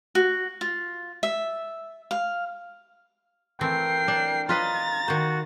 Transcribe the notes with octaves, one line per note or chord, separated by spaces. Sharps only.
F#4
F4
E5
F5
E3 A3 C4 A#4 G5 C7
D4
F4 B4 D#5 A#5 A6
D#3 F#4 C5